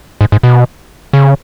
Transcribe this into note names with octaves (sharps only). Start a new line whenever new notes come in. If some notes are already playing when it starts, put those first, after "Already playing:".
G#2
G#2
B2
C#3